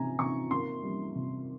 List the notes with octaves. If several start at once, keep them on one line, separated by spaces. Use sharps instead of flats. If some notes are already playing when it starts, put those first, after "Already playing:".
Already playing: C3 G#5 A#5
C3 C#6
A#3 C6
G3
C3